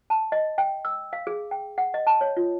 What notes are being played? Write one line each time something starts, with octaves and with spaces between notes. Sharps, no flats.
A5
D#5
G5
E6
F5
G#4
G5
F#5
D#5
A5
C#5
F4